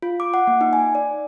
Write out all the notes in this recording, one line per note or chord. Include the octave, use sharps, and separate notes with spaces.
F4
D6
F#5
A#3
D#4
G#5
D5